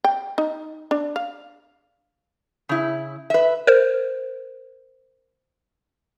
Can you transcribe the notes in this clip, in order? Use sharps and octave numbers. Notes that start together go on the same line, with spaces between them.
G5
D#4
D4
F5
C#3 E4
B4 E5
A#4 C5